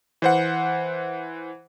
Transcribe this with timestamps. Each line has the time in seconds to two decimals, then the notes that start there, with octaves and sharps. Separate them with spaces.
0.22 E3 C5 F#5